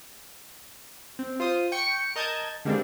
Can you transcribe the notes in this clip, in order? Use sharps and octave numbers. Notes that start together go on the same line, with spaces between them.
C4
F4 C5 D#6
G5 C#6 C#7
A#4 D#5 A5 G6 G#6
D3 G3 G#3 A#3 C4 D4